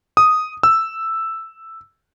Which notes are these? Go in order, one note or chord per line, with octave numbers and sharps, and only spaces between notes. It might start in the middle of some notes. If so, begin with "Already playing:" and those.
D#6
E6